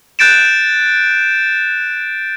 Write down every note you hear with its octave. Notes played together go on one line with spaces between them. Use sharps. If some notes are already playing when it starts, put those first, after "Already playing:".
F#6 G6 A6 D7 E7